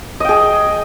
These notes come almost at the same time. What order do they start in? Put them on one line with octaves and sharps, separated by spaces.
D#5 G5 G#4